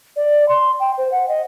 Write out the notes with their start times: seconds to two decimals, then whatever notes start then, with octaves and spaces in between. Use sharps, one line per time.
0.16 D5
0.48 C6
0.80 G5
0.98 C5
1.11 F#5
1.28 D#5